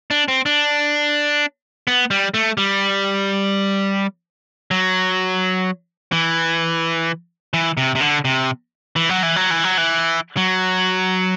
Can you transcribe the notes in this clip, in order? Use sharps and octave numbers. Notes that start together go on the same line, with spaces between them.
D4
C4
D4
B3
G3
A3
G3
F#3
E3
E3
C3
C3
D3
C3
E3
F#3
E3
F#3
E3
F#3
E3
F#3